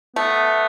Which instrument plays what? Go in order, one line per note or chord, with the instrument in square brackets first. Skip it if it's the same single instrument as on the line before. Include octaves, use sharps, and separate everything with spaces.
[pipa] A3 [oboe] B3